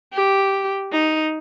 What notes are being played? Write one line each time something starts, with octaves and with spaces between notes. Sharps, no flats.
G4
D#4